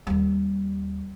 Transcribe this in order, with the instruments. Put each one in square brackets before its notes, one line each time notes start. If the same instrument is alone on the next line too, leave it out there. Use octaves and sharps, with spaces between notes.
[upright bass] D#2 G3